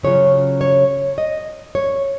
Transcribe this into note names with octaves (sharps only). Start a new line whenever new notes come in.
C#3 F#3 C#4 F4 C#5
C#5
D#5
C#5